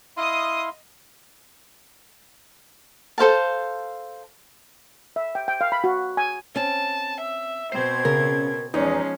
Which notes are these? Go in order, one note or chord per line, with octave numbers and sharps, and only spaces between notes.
E4 D#5 F5 C6 D#6
A4 C5 F5 A5
E5
G5
G5
F5
B5
F#4
G#5
C4 C#4 A5
E5
B2 C4 C5 G#6
C#3 A#4
E2 F3 G#3 C#4 D#4